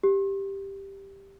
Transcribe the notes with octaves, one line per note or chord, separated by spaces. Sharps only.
G4